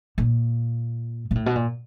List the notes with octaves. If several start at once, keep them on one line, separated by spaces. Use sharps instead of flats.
A#2
A#2
A2
B2
A#2